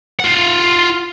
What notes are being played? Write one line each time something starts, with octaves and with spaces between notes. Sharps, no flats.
F4 F#5